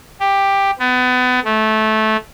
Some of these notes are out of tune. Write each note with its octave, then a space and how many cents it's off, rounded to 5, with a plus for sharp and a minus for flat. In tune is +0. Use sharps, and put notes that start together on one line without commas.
G4 +10
B3 +30
A3 -15